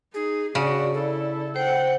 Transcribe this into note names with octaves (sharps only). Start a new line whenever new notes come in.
D#4 G#4
C#3 D4 F#4 D5
E4 A4
C5 F#5 G5